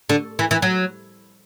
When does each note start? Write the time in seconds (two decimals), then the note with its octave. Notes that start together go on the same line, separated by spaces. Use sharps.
0.09 D3
0.39 E3
0.51 E3
0.62 F#3